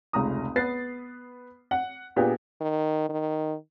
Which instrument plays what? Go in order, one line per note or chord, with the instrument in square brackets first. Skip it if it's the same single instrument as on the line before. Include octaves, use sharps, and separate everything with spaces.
[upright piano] F1 C#2 A#5 D#6
B3 B4 A6 C7
F#5
A#2 B3 D4 G4 G#4
[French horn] D#3
D#3